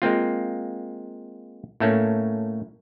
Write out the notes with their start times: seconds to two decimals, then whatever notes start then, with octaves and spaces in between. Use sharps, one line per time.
0.02 G#3 A#3 C4 F4
1.80 A2 A3 A#3 C#4